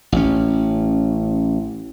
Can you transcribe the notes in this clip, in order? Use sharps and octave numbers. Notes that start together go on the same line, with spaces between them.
A1 C#4